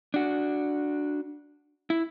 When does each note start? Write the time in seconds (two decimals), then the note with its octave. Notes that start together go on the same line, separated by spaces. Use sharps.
0.14 D4 F#4
1.90 E4